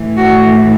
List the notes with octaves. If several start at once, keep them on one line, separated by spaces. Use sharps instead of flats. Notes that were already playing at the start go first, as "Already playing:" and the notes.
Already playing: A2 E3 A3
F#4